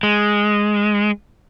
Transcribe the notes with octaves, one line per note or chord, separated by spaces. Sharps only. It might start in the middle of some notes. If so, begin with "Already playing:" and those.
G#3